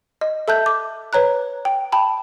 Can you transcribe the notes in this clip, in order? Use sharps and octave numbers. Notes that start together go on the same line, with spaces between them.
D#5
A4 E5 A5 F#6 G6
D6
B4 C#5 A#5 F#6
G5
G5 A5 B5